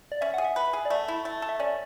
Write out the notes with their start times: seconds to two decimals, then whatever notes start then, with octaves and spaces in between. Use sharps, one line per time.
0.12 D5
0.21 C#4 E5
0.34 F#5
0.38 G#4
0.45 E5
0.56 B4
0.73 G#4
0.85 D5
0.90 A3 E5
1.08 E4
1.25 A3
1.42 A4
1.49 E5
1.60 C#4 D5